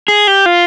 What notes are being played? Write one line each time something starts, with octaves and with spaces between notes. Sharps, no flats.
G#4
G4
F4